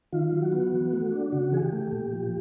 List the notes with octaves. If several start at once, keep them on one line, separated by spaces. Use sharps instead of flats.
D#3 F4
F#3
F#4
B3
E3
A3
D4
C#3 F#4
E3 G#4
G4
A3
A#2
F3